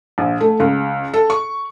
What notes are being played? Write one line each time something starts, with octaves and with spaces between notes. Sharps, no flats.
A#1
A3
C#2
A4
C#6